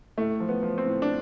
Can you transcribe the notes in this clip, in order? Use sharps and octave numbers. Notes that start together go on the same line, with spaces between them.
A2 A3
F3
B3
F3
C4
A2
D4